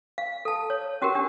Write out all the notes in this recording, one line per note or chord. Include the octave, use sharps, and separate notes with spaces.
F5
A4 A5
C#5
C#4 F#4 G4 A#4
D4 G4